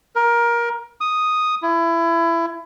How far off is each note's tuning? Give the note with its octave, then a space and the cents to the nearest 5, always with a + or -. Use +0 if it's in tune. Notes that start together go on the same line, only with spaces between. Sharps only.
A#4 +20
D#6 +0
E4 +25